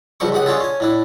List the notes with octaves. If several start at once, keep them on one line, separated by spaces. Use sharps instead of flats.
C#2 F3 G3 C4 G4 C#6
C#2 F#2 G4 F#5 D#6
C#4 D4 F4 G#4 A4
C#4 G#5
A2 D4 E4